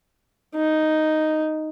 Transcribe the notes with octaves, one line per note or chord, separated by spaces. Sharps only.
D#4